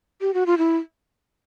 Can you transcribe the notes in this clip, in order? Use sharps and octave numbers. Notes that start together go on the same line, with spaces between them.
G4
F#4
F4
E4